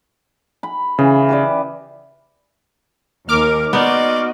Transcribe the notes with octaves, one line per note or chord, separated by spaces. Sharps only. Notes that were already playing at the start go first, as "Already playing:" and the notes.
B5
C#3 E3
G4 B4 D5
D#2 A#4 D6 F6
B3 D#4 F#4 D5 D#5 C6